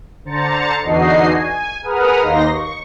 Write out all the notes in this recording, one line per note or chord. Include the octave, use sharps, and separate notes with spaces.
D3 C5 A#5 A6 C#7
E2 D3 D#4 F#4 D#5 C7
G#5
G#4 A#4 B4 F#5 D#6 F6
D#2 A#3 D#4 C6 A#6
C#6